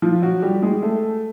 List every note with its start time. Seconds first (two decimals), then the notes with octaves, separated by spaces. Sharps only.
0.02 F3 F4
0.22 F#3 F#4
0.42 G3 G4
0.62 G#3 G#4
0.82 A3 A4